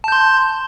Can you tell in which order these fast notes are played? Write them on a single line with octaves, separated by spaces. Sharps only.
A5 G6 C6